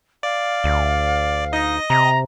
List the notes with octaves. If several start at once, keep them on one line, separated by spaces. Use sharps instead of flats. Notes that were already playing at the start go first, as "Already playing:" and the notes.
D5 F5
D2
D#4 D#5 A#6
C3 A#5